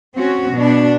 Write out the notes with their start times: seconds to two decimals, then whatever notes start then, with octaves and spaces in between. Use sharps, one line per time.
0.16 C4 C#4 F#4
0.52 B2 D4